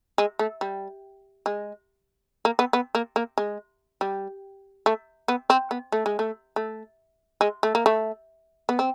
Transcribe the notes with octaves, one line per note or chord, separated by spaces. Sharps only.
G#3
A3
G3
G#3
A#3
B3
B3
A#3
A#3
G#3
G3
A3
B3
C4
B3
A3
G#3
A3
A3
G#3
A3
A#3
A3
B3
C4